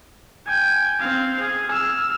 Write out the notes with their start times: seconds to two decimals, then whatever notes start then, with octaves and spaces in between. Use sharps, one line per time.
0.46 G5 G#5
1.00 C4 F5
1.40 G#4
1.71 E6 F6